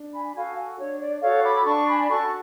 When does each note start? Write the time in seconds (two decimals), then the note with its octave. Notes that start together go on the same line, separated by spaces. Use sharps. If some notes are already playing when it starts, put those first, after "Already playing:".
Already playing: D4
0.13 G#5 B5
0.35 F#4 A4 F5 G#5
0.79 D4 C#5
1.00 D5
1.17 D5
1.22 F#4 A4 C#5 F5
1.44 B5 D6
1.55 B5
1.66 D4 A5 C#6
1.88 G#5 B5
2.03 B5
2.10 F#4 A4 A5 C#6